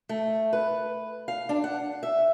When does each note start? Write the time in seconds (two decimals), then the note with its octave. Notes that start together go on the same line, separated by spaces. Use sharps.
0.09 A3
0.53 B4
1.28 F5
1.49 D4
1.64 F#5
2.03 E5